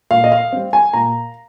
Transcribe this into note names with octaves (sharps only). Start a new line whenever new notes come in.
A#2 F5
D#5
F5
G3 C4
G#5
A#2 A#5